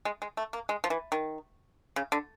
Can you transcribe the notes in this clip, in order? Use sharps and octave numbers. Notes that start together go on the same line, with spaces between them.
G#3
G#3
A3
A#3
G#3
F3
E3
D#3
C#3
D3